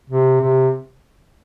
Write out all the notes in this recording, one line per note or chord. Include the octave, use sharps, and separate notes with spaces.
C3
C3